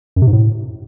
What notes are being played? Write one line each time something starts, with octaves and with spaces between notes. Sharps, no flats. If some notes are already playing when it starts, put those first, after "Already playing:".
F#2
C3
G#2
A2